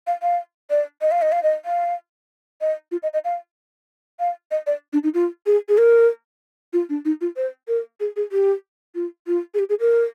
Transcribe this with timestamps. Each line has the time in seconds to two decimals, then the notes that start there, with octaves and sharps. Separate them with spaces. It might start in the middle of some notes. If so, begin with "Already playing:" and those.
0.07 F5
0.22 F5
0.70 D5
1.02 D#5
1.11 F5
1.22 D#5
1.32 F5
1.43 D#5
1.65 F5
2.61 D#5
2.92 F4
3.03 D#5
3.13 D#5
3.24 F5
4.19 F5
4.51 D#5
4.67 D5
4.93 D4
5.03 D#4
5.14 F4
5.46 G#4
5.69 G#4
5.78 A#4
6.73 F4
6.89 D4
7.05 D#4
7.21 F4
7.37 C5
7.68 A#4
8.00 G#4
8.16 G#4
8.32 G4
8.95 F4
9.27 F4
9.54 G#4
9.59 G4
9.69 G#4
9.80 A#4